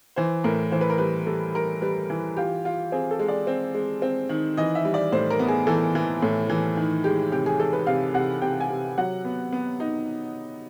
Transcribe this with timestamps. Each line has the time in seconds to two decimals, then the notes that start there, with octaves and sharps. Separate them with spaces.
0.16 E3 C5
0.44 A2 A#4
0.72 E3 C5
0.81 B4
0.90 A#4
0.98 G3 B4
1.27 G3 A4
1.55 G3 A#4
1.82 G3 B4
2.10 E3
2.36 F4 G4
2.65 F4
2.92 C4 G#4
3.11 A4
3.19 G#3
3.28 D5
3.47 C4
3.74 G#3
4.02 C4
4.29 D#3
4.57 E3 D#5
4.75 E5
4.85 G3
4.94 D5
5.12 A2 C5
5.30 A#4
5.39 B3
5.48 G#4
5.67 E3 A4
5.95 E3
6.22 A2
6.50 E3
6.77 D#3
7.04 G#3 G4
7.32 C3 G4
7.46 G#4
7.59 G#3 A4
7.73 B4
7.87 C3 F5
8.14 C3 F#5
8.42 C3 G5
8.60 G#5
8.69 C3
8.98 F#3 F#5
9.25 B3
9.53 B3
9.80 D#4